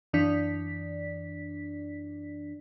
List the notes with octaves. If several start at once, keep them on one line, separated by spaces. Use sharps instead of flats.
F#2 E3 D4 D5 B6